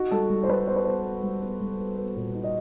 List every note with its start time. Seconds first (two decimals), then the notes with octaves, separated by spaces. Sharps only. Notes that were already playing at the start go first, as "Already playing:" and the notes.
Already playing: D#4 F#4
0.11 G3 A4
0.30 G3
0.43 C5
0.49 G3 B4
0.67 B3 C5
0.76 B4
0.85 B3 C5
1.04 B3
1.23 G3
1.42 B3
1.60 G3
1.79 B3
1.97 B3
2.16 A#2
2.35 D#4
2.44 D#5